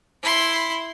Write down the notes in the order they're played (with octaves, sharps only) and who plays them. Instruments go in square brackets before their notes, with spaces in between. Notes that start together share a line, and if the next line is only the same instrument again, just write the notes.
[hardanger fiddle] E4 C6